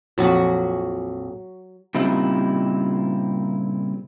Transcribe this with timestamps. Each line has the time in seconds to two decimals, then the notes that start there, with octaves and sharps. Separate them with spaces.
0.18 A#1 F2 F#3 F#4
1.95 A#2 C#3 G3 C4 D#4 E4